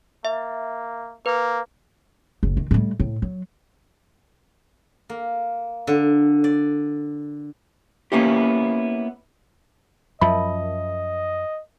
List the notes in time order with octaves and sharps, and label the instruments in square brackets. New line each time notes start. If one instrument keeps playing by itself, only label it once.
[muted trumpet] A#3 [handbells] E5
[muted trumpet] A#3 [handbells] B4
[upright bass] F#1
D#3
A2 G3
A2
F#3
[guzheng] A#3
D3
D5
[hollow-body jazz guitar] A#3 B3 C#4 E4 G4
[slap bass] F#2 F3 [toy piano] A#4 E5 A5 [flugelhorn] D#5 [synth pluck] B5